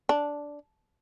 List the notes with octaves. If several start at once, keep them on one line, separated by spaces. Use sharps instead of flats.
D4